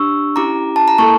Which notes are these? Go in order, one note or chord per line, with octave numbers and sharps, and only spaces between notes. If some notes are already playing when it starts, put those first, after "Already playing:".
Already playing: D4 G4 C#6 E6
C#4 E4 G4 A#5 D6
A5
A#5
A#3 E4 A4 A5 C#6